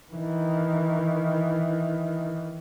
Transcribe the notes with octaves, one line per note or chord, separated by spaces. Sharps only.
D#3 E3